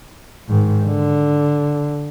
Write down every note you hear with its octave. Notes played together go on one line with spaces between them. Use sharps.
G#2 D#3
D3